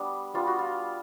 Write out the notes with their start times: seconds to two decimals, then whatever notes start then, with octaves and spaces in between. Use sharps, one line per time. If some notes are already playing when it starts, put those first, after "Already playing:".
Already playing: G3 B3 D4
0.34 G3 B3 D4 F4
0.47 F#4
0.59 F4